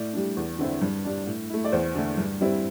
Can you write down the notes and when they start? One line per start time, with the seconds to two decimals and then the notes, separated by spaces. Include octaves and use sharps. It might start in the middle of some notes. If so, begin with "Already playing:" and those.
Already playing: A2 D5
0.13 G3 D4
0.37 E2
0.59 D3 C4 E4
0.81 G2
1.05 G3 D4
1.27 A2
1.50 A3 E4
1.65 D5
1.72 E2 C5
1.95 D3 A3
2.17 G2
2.41 G3 C4 E4